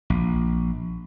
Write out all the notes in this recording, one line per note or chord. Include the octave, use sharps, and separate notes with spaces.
A#1